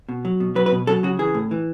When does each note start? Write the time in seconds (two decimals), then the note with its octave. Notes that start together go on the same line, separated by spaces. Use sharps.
0.09 B2
0.25 F#3
0.40 B2
0.55 F#3 B4
0.66 B4
0.72 B2
0.87 F#3 A4
1.03 C#3 F#4
1.19 E3 G#4
1.34 A2
1.51 E3